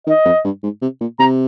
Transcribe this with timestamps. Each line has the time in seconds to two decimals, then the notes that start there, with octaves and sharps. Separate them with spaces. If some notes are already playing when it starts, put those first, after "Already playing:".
0.07 D#3 D#5
0.25 F2
0.44 G2
0.63 G#2
0.82 C3
1.01 A#2
1.19 C3 A#5